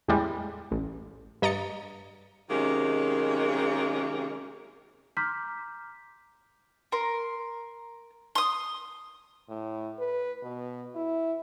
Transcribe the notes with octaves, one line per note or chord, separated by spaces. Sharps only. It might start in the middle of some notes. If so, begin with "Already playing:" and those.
E2 A2 G3 G#3
A1
G2 D#5 A#5 A6 C#7
C3 D#3 F#3 G#3 A#3 C#4
A#5 C6 D6 F6 G6 B6
A#4 C6
C6 D#6
A2
B4
B2
E4